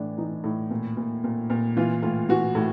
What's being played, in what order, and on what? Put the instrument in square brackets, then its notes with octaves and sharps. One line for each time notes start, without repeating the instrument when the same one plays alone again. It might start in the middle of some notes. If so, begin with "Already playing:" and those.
Already playing: [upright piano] A2 E3 D4
E3 D#4
A2
A#2
A#2
A#2
A#2
E3 F4
A2 F4
E3 F#4
A2